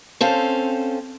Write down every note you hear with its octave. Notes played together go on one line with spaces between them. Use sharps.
C4 C#4 A4 C5 F5